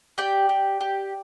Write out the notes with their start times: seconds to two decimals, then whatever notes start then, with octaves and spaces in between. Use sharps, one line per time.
0.18 G4 D5 G5
0.49 G4
0.81 G4